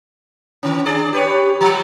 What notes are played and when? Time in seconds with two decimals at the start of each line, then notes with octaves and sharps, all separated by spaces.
0.63 D#3 C#4
0.86 D4 G#4 D5
1.13 G4 B4 C#5
1.61 F3 G3